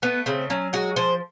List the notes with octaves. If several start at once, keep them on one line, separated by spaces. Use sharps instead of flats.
A3 B3
C#3 C4
F#3 C#4
G#3 F#4
F3 C5